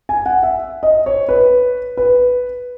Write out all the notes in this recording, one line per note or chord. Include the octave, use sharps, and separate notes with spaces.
G#5
F#5
E5
D#5
C#5
B4
B4